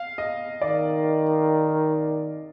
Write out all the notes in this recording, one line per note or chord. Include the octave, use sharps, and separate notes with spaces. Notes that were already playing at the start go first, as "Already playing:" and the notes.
Already playing: F5
D#5
D#3 D5